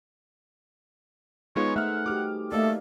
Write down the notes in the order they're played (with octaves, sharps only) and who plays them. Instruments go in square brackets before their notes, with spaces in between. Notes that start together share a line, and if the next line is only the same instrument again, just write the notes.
[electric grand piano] G#3 B3 F4 [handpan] D#4 G#4 B4 [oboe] C#5
[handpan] A3 C5 [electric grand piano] E5 F6 [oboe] F#5
[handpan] F#4 G4 [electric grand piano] D6 F6
[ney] A3 [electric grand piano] A#3 [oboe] A4 [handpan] D5 D#5 F5